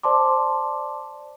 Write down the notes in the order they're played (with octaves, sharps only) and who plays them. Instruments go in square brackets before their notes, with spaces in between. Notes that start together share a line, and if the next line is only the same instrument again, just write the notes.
[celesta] C5 D5 A5 C6 D6